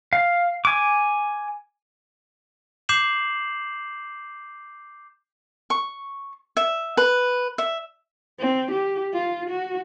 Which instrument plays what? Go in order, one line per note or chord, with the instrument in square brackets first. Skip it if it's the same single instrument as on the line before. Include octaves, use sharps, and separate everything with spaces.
[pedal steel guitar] F5
G#5 D6
[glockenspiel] D6 G6 C7 E7 F#7
[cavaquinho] C#6
E5
B4
E5
[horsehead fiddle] C4
G4
F4
F#4